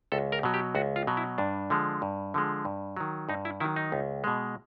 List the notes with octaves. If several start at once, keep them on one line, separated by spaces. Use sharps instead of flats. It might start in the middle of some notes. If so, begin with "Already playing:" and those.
C#2 A4
A#4
B2 F#3
G4
C#2 F#4
F4
B2 F#3
E4
G2 D4
D3 F3 G#3
G2
D3 F3 G#3
G2
D#3 F#3
G2 D#4
E4
D#3 F#3 E4
D#4
C#2
B2 G#3